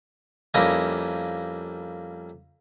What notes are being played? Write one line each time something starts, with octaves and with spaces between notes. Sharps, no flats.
F2 G3 A#3 C#4 E4 D#5